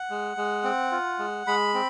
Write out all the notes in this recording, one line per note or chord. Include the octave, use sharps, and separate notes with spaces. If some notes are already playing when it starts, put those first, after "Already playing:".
Already playing: F#5
G#3
G#3
C4
F4
G#3
G#3 B5
C4